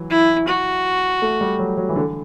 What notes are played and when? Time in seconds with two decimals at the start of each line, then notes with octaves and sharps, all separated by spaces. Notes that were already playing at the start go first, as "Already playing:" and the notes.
Already playing: E3 F#3
0.11 E4
0.48 F#4
1.22 A3
1.41 G3
1.59 F#3
1.78 F#3
1.89 E3
1.96 D3